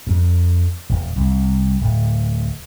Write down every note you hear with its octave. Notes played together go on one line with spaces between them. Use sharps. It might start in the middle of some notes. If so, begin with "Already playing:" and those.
F2
E1
C2
D1